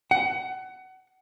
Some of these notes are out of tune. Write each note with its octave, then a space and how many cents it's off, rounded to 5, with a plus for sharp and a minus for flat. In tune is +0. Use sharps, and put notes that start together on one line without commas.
F#5 +25